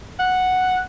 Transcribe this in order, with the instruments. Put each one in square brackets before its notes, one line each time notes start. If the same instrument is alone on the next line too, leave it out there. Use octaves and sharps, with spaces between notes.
[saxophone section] F#5